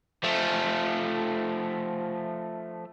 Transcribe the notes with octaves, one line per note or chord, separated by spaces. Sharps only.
F3 A3